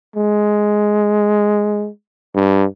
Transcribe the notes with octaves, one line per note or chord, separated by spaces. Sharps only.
G#3
G2